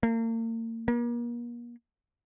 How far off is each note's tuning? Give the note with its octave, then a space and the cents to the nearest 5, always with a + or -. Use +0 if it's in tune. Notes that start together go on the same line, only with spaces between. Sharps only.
A#3 -40
A#3 +40